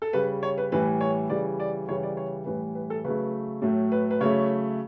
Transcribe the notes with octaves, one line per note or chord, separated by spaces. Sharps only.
A4
C#3 G3 B4
C#5
B4
A2 E3 G3 B4
C#5
C#3 E3 G3 D5
D5
C#3 E3 G3 C#5
D5
C#5
A2 E3 G3 B4
B4
A4
C#3 F#3 A3 B4
A2 F#3 A3
B4
B4
C#3 F#3 A3 C#5